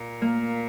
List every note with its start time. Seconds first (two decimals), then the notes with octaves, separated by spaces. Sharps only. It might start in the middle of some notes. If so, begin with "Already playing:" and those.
Already playing: A#2
0.22 A#3